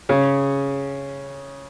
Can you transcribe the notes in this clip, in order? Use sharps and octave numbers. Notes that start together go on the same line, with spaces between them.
C#3 C#4